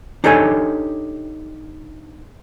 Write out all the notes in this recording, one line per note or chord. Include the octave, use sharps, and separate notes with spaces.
D4 D#4 G4 A4 C#5 G#5